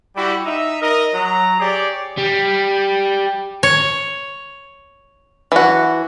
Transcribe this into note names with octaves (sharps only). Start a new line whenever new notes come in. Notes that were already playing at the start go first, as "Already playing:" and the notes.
G3 E4 F#4 G4
D#4 E5
A#4 D#5
F#3 A#5
G4 G#4 C#5 D5
G3
C#5
E3 F#4